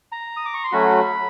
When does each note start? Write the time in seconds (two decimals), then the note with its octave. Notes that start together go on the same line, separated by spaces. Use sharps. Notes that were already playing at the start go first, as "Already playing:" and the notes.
0.12 A#5
0.37 D#6
0.46 D6
0.54 C#6
0.64 C6
0.72 F#3 A3 C#4 F#4 B5